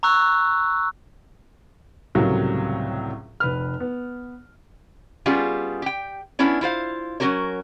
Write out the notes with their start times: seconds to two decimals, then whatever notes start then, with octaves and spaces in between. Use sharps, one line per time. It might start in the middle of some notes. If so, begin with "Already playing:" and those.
0.03 A#5 C#6 E6 F#6
2.15 C#2 A2 C3 F#3 G3 A#4
3.40 F1 B4 F6
3.80 B3
5.26 G3 B3 C#4 F4 G4 G#4
5.82 G4 G5
6.39 B3 C#4 D4 E4 C#5
6.61 E4 F4 C5 F5
7.20 F#3 C#4 F#4 G4 A#4 C#5